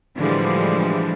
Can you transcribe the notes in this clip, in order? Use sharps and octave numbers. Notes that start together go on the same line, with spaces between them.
A2 D3 E3 F3 G3 G#3